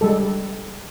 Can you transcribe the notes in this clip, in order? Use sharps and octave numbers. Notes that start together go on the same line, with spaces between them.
G3 G#3 A4